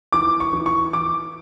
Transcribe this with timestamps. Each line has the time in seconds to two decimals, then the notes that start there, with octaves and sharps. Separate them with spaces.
0.12 E3 D6
0.40 C#6
0.53 E3
0.66 C#6
0.93 E3 D6